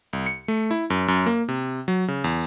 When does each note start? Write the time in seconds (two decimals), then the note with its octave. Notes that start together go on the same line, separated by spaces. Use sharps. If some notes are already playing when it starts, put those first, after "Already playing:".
0.13 C2
0.26 C#7
0.48 A3
0.71 E4
0.90 F#2
1.08 F#2
1.26 A#3
1.48 C3
1.88 F#3
2.08 C#3
2.24 E2